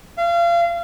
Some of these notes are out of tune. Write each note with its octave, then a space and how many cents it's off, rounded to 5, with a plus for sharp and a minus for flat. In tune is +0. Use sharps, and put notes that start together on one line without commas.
F5 -30